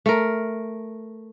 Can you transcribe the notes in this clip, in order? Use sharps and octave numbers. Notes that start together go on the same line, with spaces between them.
A3 A#4